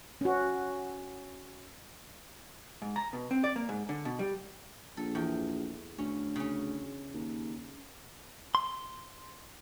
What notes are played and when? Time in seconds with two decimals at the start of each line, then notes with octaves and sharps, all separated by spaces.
0.21 C#4 F#4
2.82 G#2
2.96 A#5
3.13 B2
3.31 C4
3.44 D5
3.56 A#3
3.69 G#2
3.89 D3
4.05 B2
4.19 G3
4.97 A#1 A4
5.15 E2 G5
5.98 D2 C#4
6.36 C#3 C#4
7.13 D#2
8.55 C6